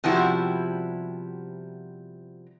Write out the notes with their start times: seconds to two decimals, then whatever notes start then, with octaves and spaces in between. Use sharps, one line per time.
0.04 C3 F3 G3 B3 E4 F#4